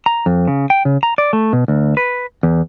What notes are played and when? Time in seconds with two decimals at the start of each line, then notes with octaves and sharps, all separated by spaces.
0.06 A#5
0.26 F2
0.48 C#3
0.70 G5
0.85 C#3
1.03 A#5
1.18 D5
1.33 A3
1.53 B2
1.68 D2
1.97 B4
2.43 E2